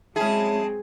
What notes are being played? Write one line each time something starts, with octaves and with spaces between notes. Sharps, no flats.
F#3 G#3 C4 C#4 E4 G#4 A5